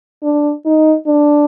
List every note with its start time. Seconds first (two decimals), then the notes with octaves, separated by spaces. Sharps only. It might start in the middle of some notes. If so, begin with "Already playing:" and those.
0.23 D4
0.66 D#4
1.07 D4